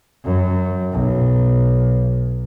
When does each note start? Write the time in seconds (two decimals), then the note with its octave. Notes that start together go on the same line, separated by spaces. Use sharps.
0.24 F#2
0.92 B1